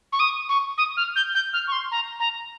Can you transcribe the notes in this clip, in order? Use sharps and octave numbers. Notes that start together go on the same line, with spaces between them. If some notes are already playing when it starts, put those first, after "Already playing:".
C#6
D#6
C#6
D#6
F6
G6
G6
F6
C#6
C6
A#5
A#5